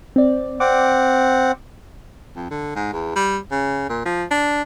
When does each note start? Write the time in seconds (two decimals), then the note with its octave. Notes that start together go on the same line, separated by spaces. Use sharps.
0.16 C4 D5
0.60 C4 F#5 D6
2.36 F2
2.50 D3
2.76 G#2
2.93 E2
3.16 G3
3.51 C#3
3.89 A#2
4.05 F3
4.31 D4